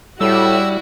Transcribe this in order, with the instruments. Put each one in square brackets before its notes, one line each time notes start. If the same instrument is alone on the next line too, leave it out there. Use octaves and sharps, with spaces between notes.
[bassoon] A2 [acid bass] G3 [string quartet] E4 F#4 [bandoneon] E6